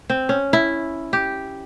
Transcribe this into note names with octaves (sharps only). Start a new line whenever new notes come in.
C4
C#4
E4
G4